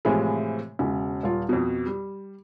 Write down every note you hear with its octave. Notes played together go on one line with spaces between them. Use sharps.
A2 C3 E3 F3 G#3
E1 C#3
D#1 F4
F2 B2
G3